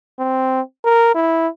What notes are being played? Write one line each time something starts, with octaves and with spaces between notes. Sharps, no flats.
C4
A#4
E4